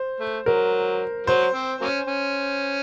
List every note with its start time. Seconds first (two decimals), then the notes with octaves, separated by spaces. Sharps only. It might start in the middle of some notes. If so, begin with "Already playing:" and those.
Already playing: C5
0.20 A3
0.46 F#3 A#4
1.27 F#3 C5
1.54 C4
1.81 F#3 A#3 C#4
2.07 C#4